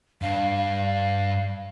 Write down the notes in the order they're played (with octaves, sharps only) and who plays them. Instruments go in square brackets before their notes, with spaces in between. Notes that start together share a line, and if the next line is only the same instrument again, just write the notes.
[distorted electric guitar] G2 D4 [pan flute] F5